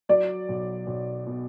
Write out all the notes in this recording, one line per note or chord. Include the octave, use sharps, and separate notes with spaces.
F#3 D5
B1
B1
B2